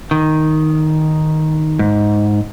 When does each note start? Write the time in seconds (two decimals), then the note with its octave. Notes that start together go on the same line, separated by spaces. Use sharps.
0.11 D#3
1.79 G#2